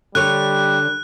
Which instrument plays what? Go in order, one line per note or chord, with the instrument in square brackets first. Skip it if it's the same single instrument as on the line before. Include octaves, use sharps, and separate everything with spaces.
[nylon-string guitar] D3 C#5 [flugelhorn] G3 [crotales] F#6